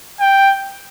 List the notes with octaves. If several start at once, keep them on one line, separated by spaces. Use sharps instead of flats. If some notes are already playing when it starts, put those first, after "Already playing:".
G5